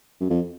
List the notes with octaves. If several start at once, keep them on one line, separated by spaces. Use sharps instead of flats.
F#2
F2